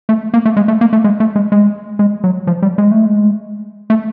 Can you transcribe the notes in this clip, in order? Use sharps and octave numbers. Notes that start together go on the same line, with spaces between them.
A3
A#3
A3
G#3
A3
A#3
A3
G#3
A3
G#3
G#3
G#3
F#3
F3
G3
G#3
A3
G#3
A3